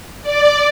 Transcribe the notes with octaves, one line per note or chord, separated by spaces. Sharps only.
D5